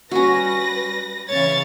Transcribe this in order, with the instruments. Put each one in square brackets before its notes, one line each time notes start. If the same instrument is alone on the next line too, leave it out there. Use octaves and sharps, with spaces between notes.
[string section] G3 B4 A#6 [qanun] C#4 F#4
[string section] C#3 E3 A6 [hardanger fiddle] C#5 F5